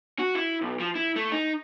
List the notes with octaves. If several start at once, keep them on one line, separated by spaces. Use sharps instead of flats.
F#4
E4
B1
F3
E4
A3
D#4